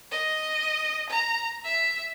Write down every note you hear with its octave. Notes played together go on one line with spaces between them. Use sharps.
D#5
A#5
E5